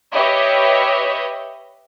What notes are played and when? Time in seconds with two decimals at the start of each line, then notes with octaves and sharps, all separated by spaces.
0.14 G4 B4 C#5 D#5 E5